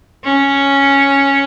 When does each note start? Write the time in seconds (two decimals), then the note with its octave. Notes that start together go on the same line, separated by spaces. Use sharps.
0.24 C#4